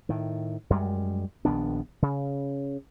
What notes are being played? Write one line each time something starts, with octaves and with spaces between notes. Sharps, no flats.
A2 D#3
F#2 G3 G#3
A#1 D#3 B3 D4
C#3